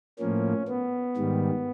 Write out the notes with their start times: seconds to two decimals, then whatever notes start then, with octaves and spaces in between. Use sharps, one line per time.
0.19 A2 F3 A#3 C#4
0.68 B3
1.16 G#2 D#3 G3